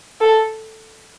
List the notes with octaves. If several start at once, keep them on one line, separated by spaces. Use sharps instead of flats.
A4